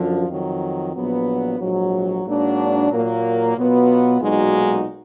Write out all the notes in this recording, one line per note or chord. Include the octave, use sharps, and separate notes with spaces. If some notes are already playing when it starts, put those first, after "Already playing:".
Already playing: F#2 D3 F3
F2 D#3 F#3
A#1 A#2 F#3 B3
A#1 G#2 F#3
G#2 F#3 A#3 D4 F#4
A#2 F#3 A#3
B2 F#3 B3 F4
B1 A#2 G#3 D#4 F#4